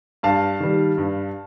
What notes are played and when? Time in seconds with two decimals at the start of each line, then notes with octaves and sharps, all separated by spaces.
0.23 G2 F5 A5
0.60 D#3 G3
0.98 G2